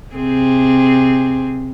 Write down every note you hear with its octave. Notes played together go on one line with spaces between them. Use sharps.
C3 C4 G#4